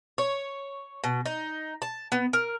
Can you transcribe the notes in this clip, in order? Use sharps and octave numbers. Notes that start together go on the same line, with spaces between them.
C#5
B2
D#4
A5
B3
A#4